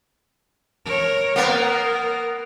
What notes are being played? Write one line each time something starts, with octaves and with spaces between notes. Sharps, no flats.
A#4 C#5
A#3 B3 A#4